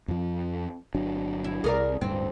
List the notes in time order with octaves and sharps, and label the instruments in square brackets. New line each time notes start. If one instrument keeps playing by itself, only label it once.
[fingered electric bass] F2 F3
G1 F#3 D4
[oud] E4
[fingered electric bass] C2 [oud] G#4 A#4 D5
[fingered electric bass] D1 G2 [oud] C4